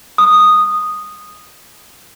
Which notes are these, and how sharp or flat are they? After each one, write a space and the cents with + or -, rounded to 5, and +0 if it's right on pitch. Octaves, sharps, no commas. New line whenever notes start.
D#6 -10